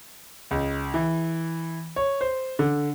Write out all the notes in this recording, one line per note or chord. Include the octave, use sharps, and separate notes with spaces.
C#2
E3
C#5
C5
D3